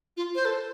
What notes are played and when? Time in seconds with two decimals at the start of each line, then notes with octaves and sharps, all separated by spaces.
0.17 F4
0.35 C5
0.45 A4